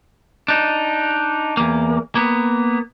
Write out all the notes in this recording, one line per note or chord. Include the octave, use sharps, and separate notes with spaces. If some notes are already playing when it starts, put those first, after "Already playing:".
D4 D#4
E2 A#3
A#3 B3